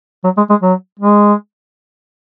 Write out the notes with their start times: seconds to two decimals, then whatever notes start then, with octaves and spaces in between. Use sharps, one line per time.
0.24 F#3
0.37 G#3
0.49 G#3
0.62 F#3
0.99 G#3